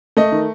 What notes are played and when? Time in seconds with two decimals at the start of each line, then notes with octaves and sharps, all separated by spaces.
0.17 A3 D#5
0.32 D#3